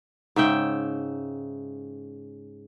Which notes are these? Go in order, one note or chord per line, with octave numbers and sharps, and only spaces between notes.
G#2 C#3 E5 G5